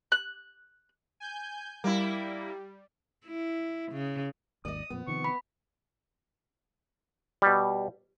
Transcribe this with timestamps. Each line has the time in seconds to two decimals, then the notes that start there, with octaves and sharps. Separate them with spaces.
0.12 F#6
1.20 G#5 G6
1.84 G3 A#3 E4
3.26 E4
3.92 C#3
4.65 G#1 D#2 D5 D#5 D#6
4.90 F2 A#2 F3 B3
5.07 C3 D#3 F3 C#6
5.24 B5
7.42 B2 G3